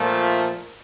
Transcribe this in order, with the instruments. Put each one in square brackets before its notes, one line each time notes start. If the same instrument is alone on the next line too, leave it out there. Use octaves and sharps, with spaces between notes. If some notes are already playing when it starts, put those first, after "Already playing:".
Already playing: [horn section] A#2 F3 A3